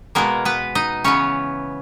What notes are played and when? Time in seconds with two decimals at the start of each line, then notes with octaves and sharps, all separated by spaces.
0.15 B2 G#3 A#3 B3 A#4
0.45 B3 B4
0.75 D#4 D#5
1.04 C#3 E3 B3 C#4 C#5